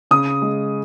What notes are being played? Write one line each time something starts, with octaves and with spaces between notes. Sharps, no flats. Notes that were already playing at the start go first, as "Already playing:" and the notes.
C#3 D#6
G#3